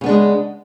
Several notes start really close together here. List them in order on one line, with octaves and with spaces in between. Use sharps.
C#3 B3 D4 G#3